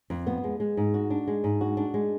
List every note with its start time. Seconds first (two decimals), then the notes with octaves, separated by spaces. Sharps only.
0.10 F2
0.27 B3
0.44 G#3
0.60 G#3
0.77 G#2
0.94 F#4
1.10 D4
1.28 G#3
1.44 G#2
1.61 F#4
1.77 D4
1.94 G#3